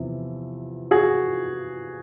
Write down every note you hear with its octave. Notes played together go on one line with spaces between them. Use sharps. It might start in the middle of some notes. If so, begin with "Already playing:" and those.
Already playing: E2 C3 F3
F#4 G#4